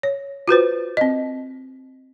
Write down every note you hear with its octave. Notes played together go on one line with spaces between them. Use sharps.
C#5
F4 F#4 B4 C5
C4 D#5